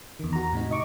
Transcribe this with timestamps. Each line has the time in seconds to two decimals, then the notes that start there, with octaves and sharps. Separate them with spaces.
0.19 E2 D#3
0.33 F#4 A#5
0.53 A2 C3 D#4
0.71 D#5 C#6 D6